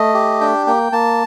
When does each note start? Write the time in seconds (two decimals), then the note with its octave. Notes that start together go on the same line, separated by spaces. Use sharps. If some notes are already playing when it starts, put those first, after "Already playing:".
Already playing: A3 D#5
0.14 G4
0.41 D4 G5
0.67 A#3 G5
0.92 A#3 A5